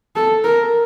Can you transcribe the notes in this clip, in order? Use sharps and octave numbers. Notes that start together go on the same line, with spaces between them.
A4
A#4